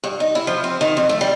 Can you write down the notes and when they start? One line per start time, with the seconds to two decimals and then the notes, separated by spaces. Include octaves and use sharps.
0.04 G2
0.20 D#4
0.35 E4
0.47 F3
0.64 C4
0.81 D#3
0.97 F2
1.09 A3
1.21 G3